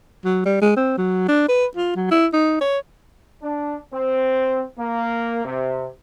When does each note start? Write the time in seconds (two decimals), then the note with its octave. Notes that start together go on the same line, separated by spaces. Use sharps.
0.25 F#3
0.45 G3
0.62 G#3
0.76 C4
0.98 F#3
1.28 D4
1.49 B4
1.76 F4
1.96 F#3
2.11 E4
2.33 D#4
2.61 C#5
3.42 D4
3.93 C4
4.78 A#3
5.45 C3